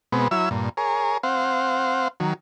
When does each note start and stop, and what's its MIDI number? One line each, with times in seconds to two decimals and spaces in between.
0.12 0.28 47
0.12 0.28 56
0.12 0.28 59
0.12 0.28 60
0.31 0.49 54
0.31 0.49 64
0.31 0.49 73
0.31 0.49 76
0.31 0.49 88
0.51 0.69 43
0.51 0.69 46
0.77 1.18 68
0.77 1.18 70
0.77 1.18 73
1.23 2.08 60
1.23 2.08 72
1.23 2.08 77
1.23 2.08 78
2.20 2.34 51
2.20 2.34 54